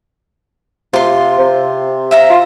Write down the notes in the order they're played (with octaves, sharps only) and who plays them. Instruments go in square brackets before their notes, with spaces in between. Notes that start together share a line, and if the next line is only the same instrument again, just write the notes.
[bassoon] C3 [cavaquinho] F4 C6
[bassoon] C3
[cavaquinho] E5 F5 A#5
[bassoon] F4